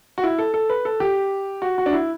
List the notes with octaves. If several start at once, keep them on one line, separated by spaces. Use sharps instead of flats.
F#4
E4
A4
A4
B4
A4
G4
F#4
F#4
D4
E4